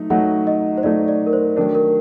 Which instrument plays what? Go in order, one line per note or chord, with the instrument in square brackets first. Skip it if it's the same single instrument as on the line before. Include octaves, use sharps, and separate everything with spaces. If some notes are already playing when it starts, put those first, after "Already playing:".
Already playing: [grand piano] F#3 A3 D#4
[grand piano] F#3 A3 D#4 [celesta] F#5
[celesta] D#5
C5
[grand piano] F#3 A3 D#4 [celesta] D5
[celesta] D5
A#4
C5
[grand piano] D#3 F#3 A3 D4 [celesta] A#4
[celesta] A#4